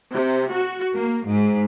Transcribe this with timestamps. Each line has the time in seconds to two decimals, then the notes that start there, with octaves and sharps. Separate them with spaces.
0.11 C3
0.50 F#4
0.95 A#3
1.26 G#2